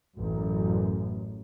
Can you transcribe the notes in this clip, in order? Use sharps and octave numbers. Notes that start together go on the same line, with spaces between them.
A1 F#2